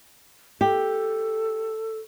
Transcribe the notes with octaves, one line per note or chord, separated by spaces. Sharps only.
G4 A4